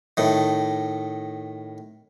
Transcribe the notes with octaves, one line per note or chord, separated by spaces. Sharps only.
A2 D#3